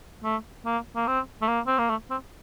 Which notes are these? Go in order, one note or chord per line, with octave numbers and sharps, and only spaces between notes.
A3
A#3
A#3
C4
A3
A#3
C4
A#3
A3
C4